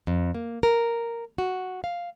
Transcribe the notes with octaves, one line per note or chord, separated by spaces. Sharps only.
F2
A#3
A#4
F#4
F5